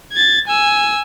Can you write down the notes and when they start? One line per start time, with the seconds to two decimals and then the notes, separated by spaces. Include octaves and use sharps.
0.12 G#6 A6
0.47 G#5 E6